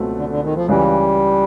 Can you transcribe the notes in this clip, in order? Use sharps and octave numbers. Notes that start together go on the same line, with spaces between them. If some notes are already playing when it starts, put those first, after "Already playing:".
Already playing: C#2 B2 F#3 A3 C4
D3
D3
D#3
F3
C#2 C#3 E3 G3